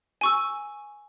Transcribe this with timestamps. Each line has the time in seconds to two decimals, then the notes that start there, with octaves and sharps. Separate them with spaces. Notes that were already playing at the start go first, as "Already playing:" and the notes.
0.21 G#5 C#6 E6